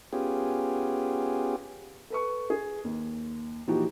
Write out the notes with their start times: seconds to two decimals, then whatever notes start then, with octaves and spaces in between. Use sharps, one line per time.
0.13 B3 C#4 F4 G4 G#4
2.10 A4 B4 C#6
2.50 G#4
2.85 D#2
3.67 A#2 E3 F3 D#4 F#4 G4